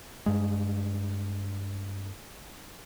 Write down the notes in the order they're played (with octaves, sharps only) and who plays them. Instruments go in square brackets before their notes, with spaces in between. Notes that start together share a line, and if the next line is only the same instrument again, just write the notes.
[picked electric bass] G2 G#3